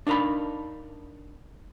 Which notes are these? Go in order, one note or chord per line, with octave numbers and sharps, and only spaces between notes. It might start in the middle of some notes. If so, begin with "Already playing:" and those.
D4 D#4 A#4 F5 B5